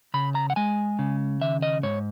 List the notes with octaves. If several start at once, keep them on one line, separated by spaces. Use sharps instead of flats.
C#3 B5
A#5
F#5
G#3 G#5
C#3
D#3 E5
D#5
G#2 C#5